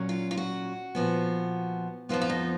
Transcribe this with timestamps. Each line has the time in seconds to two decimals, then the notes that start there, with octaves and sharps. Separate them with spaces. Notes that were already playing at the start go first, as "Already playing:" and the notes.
Already playing: A#2 F#3 C#4
0.09 F4
0.31 F4
0.37 F#4
0.95 A#2 F3 B3
2.09 F2 F3 B3 F4
2.22 F4
2.29 D#4